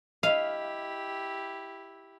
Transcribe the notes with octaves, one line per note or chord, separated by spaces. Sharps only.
E4 G4 D#5 F5